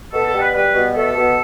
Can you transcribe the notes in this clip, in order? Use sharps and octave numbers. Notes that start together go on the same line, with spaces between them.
B2 A4
A4
G3
B4
G3 B4
B2
A3 A4
B2